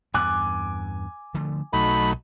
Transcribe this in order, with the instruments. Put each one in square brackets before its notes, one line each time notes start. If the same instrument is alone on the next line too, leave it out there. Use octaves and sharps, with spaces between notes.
[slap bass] E2 G2 [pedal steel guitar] G#5 D6 F#6
[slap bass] D3 F3 A3
[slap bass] B1 [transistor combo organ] F#3 A3 D#4 [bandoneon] B5